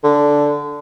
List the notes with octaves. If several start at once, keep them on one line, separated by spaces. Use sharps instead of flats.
D3